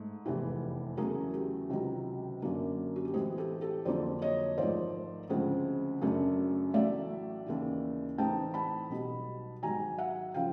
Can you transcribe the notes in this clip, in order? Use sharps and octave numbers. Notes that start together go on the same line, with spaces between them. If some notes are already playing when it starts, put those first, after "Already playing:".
Already playing: G#2 A3
F1 E2 C3 E3
E2 C#3 F#3 A3 G#4 A#4
G4
C#2 C3 D#3 F#3
F#2 D3 F#3 A#3 D4
F#4
G4
A2 E3 G#3 C4 F#4 G#4
G4 A4
G4 A4
F2 D3 F#3 A#3 D4 C5 D5
C#5 D#5
G#1 G#2 F3 A3 C5 D5
D2 C#3 F3 G#3 C4
F#2 C#3 F#3 A3 D4
A1 A2 F#3 A3 D5 E5
D#2 C#3 E3
A2 E3 A3 C4 D#4 G5 A5
A5 B5
B1 B2 G3
G#2 D#3 F#3 G#5 A#5
E5 F#5
C#3 F3 F5 G5